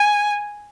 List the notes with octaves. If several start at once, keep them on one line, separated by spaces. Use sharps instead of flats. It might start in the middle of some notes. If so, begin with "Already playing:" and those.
Already playing: G#5